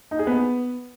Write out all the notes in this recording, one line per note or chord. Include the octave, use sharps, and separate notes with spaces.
D#4
G#4
B3